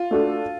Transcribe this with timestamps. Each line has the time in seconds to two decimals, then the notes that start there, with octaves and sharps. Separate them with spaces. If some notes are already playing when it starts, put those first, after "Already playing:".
Already playing: F4
0.11 A3 D4 F#4 A4